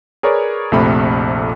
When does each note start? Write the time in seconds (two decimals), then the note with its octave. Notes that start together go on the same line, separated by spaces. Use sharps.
0.23 G#4 A#4 B4 C#5 D5
0.72 A#1 F2 C3 A3 B5